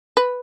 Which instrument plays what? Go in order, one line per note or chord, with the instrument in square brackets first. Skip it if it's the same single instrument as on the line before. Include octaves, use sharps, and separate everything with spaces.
[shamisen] B4